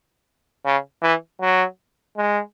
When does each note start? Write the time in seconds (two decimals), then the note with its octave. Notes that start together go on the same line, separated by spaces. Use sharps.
0.65 C#3
1.02 E3
1.41 F#3
2.17 G#3